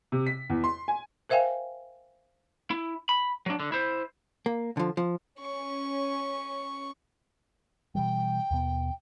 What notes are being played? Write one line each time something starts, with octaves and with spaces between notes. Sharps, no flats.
C3
B6
E2
C6
G#5
A#4 C5 E5 F5 G5 G#5
E4
B5
F#3 D4
D3
E4 C5
A#3
D3 F3
F3
C#4 C#6
B2 E3 G3 G5
D#2 B2 B3